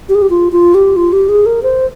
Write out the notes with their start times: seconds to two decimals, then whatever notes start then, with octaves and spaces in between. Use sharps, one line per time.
0.09 G4
0.15 G#4
0.22 G4
0.30 F4
0.52 F4
0.74 G4
0.96 F4
1.13 G4
1.29 G#4
1.46 A#4
1.63 C5